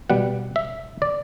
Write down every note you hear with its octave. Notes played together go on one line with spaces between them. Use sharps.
B2 G3 F#5
E5
D5